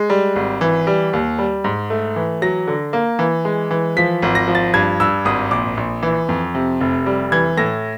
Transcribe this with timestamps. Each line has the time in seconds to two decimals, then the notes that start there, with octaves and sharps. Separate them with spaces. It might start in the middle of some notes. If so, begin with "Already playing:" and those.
Already playing: G#3
0.10 G3
0.36 G#1
0.61 E3
0.87 G3
1.13 D#2
1.39 G3
1.64 G#2
1.90 A3
2.16 E3
2.42 F#3 A#6
2.67 D3
2.93 A#3
3.19 E3
3.45 G#3
3.71 E3
3.97 F3 B6
4.22 G#1
4.35 A#6
4.48 F3
4.55 A6
4.74 G2 G#6
5.00 G2 E6
5.25 G#1 D#6
5.51 A#1 D6
5.77 A#1
6.03 E3
6.29 F2
6.55 C3
6.81 F1
7.06 G3
7.32 E3 G#6
7.57 A2 A#6